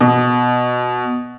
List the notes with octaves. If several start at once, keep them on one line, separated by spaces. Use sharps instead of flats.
B2